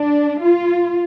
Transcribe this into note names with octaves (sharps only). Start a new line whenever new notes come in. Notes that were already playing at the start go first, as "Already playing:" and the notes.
Already playing: D4
F4